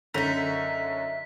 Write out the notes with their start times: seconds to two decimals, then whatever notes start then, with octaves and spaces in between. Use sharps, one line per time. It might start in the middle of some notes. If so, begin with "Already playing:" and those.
0.14 F#2 D3 C#4 D#4 E5 B6